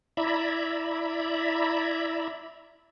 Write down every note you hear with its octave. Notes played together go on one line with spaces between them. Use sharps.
E4 D5 E5 A#5 B5